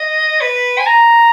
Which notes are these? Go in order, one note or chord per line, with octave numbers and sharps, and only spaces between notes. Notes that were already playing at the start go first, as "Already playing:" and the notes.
Already playing: D#5
B4
G#5
A#5